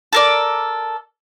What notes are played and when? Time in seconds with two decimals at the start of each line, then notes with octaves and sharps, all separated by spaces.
0.13 A4 A#4 D5